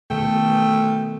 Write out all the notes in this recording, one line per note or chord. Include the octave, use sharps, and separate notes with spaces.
B2 D#3 A3 A4 G5